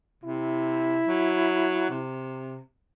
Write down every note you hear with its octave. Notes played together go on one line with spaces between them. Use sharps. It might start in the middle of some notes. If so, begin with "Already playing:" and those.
C3 E4
F#3
C3